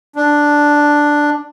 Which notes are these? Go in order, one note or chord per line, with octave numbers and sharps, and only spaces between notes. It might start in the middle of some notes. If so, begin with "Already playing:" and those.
D4